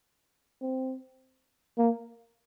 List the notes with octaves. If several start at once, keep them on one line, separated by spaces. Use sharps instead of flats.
C4
A#3